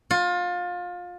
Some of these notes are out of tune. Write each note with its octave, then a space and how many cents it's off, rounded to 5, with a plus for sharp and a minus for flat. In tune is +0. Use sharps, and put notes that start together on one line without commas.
F4 +25